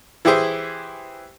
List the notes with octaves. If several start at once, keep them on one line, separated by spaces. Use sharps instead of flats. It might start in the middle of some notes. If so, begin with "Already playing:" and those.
E3 E4 G4 G#4 C5